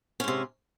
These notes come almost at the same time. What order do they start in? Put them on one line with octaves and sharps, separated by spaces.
C#4 G#2 C3